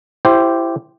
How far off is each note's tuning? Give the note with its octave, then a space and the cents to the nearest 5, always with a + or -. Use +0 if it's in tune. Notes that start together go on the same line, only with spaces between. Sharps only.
E4 +25 G4 -5 C5 +0